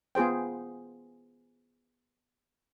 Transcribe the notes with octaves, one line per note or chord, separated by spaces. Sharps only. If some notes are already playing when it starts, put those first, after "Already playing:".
B3 F4 G#4 C5 G5